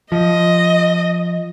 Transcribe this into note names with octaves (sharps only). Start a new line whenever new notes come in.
F3 D#5